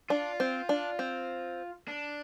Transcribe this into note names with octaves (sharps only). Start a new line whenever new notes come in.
D4 F4
C4
D4
C4
D4